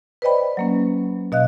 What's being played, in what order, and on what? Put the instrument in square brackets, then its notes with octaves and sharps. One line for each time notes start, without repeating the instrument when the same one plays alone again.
[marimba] B4 C5 D5 D#5 G5 B5
F#3 A#3 C#4
B2 D#5 F5 F#6